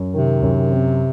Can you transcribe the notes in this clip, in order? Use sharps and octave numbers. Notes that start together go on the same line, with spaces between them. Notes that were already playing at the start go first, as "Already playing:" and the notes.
Already playing: F#2
C3 D#3
F#2
C4